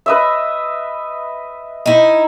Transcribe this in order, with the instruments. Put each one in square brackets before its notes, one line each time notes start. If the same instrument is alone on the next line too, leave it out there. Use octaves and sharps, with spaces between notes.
[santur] B4 D#5 E5
[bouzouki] D#4 E4